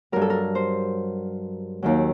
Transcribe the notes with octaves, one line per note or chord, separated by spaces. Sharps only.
G2 F#3 A#4
A4
A#4
C5
D#2 D#3 F#3